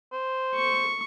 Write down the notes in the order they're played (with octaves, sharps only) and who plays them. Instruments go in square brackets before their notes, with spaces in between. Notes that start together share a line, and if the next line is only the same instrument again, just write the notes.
[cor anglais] C5
[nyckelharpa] C#6